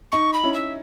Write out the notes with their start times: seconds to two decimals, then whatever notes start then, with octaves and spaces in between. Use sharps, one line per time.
0.12 D#4 C#6
0.33 B5
0.43 C#4 E4
0.54 E5